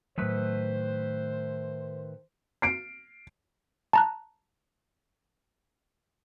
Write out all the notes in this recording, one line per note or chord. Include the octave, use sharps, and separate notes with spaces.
A2 D#3 F#3 A3 B4 C5
C7 D7
A5 A#5 F#6